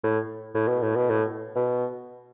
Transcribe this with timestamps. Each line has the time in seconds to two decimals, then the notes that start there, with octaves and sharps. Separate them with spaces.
0.04 A2
0.55 A2
0.68 B2
0.83 A2
0.96 B2
1.10 A2
1.56 B2